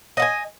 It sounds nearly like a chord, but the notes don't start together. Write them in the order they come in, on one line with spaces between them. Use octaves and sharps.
D#5 F#5 G#5